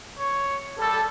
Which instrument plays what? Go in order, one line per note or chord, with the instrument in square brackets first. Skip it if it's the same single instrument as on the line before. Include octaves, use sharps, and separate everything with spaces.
[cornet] C#5
[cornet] G3 [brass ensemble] A4